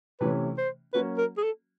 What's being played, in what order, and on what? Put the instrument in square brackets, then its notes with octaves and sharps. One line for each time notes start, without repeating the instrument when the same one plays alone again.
[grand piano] C3 E3 A3 C#4 [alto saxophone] B4
[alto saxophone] C5
[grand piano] F#3 A#3 C#4 F#4 [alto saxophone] B4
[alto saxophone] A#4
G#4
A4